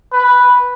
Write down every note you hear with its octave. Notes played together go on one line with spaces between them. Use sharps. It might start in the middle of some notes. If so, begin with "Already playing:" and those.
B4